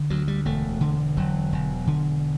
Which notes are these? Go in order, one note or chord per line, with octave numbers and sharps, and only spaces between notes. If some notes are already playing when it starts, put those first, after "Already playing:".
Already playing: D3
D2 F#3
G3
E1 A3
D3
E1 F#3
E1
D3